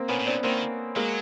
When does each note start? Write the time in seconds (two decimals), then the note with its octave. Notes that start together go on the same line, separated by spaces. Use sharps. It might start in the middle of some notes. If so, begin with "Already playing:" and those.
Already playing: A#3 C4
0.09 A#2 B3 C#4
0.19 A2
0.26 A#2 C4 D4
0.44 D#3 A#3 C4
0.96 F#3 G#3 A#3